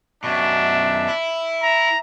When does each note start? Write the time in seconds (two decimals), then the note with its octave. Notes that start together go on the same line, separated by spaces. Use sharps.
0.24 F#2 B2 D4 E5
1.08 E4
1.62 E5 A#5